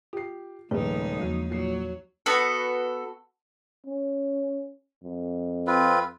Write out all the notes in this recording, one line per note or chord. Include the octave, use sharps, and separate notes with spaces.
F4 G4 C7
D#1 C#3 F3 G#3 A3 D#4 G#4 B4
E2 F3 F#3 A#3
A#2 F#3 C7
B3 F#4 A4
C#4
F2
C4 F4 B4